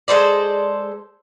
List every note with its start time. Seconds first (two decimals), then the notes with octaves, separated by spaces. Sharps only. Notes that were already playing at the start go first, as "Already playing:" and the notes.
0.08 G#3 A4 C5 D5